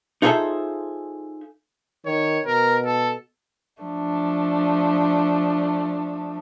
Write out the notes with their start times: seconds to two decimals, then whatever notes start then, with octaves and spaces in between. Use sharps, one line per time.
0.22 D#4 F4 G#4 A4 C5 E5
2.06 D#3 C#5
2.46 B2 A#4
2.85 A4
3.81 F3 A3 D4